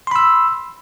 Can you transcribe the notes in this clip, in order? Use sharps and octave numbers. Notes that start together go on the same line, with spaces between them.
B5 C6 E6